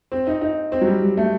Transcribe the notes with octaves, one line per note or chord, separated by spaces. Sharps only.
C4
D#4
D#4
C4
F#3
G3
G3
A3